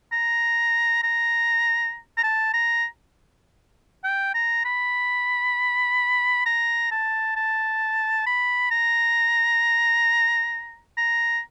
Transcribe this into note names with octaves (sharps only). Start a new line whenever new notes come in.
A#5
A#5
A#5
A5
A#5
G5
A#5
B5
A#5
A5
A5
B5
A#5
A#5